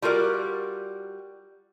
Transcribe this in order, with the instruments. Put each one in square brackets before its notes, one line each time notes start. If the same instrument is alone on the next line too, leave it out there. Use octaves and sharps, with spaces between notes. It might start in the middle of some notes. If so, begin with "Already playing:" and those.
[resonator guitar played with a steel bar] G3 F4 F#4 A#4 D5